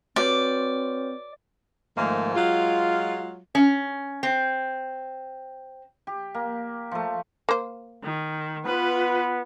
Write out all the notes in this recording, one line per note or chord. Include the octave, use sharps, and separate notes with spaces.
C4 F#4 B4 C#5 D5
G#2 D#3 F3 A3 A#3
F#3 G#3 F4
C#4
C4
G4
A#3
F3 A3
A#3 C5
D#3
B3 F4 B4